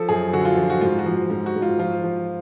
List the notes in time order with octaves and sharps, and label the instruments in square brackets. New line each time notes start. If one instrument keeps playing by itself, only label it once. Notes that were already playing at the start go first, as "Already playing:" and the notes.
Already playing: [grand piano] F3 A4
F#2 G#4
D3 F#4
F4
F3
F#4
G#2 F4
F#4
F3
G#2
F#4
G#2
F4
F3 F4
F3